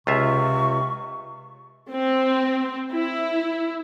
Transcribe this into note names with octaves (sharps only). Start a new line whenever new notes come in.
C#2 C3 F4 E5 C#6
C4
E4